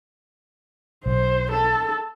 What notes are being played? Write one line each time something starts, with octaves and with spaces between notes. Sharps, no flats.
B1 C5
A4